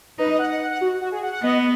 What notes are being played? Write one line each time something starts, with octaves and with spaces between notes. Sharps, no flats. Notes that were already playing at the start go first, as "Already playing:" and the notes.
D#4 B4
D#5
F#5
F#5
F#5
F#5
F#4
F#4
G#4
F#5
F#5
B3 D#5